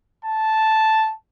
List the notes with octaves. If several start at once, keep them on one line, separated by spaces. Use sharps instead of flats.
A5